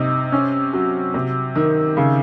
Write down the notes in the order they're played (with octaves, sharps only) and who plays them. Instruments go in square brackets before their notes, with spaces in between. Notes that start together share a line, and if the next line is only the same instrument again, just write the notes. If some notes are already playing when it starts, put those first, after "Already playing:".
Already playing: [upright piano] C3 D#4
C#4
F#3
C3
D#3
C#3